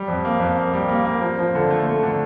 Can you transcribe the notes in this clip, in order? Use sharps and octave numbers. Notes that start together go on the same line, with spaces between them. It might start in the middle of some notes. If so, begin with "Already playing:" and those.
Already playing: G3
F2
A#3
F2
A#3
G3
A#3
A#3
F3
F3
D3
A3
A3
D3